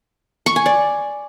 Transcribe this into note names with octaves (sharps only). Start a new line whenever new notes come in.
C#6
G#5
D5